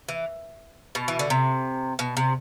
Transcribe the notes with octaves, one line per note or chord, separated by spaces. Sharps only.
E3
B2
E3
D3
C3
B2
C3